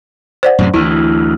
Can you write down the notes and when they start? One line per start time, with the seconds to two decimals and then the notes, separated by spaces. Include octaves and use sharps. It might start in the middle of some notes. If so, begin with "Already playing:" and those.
0.43 C5 D5 F#5
0.59 F#2 A2 C3
0.74 D2 E3 E4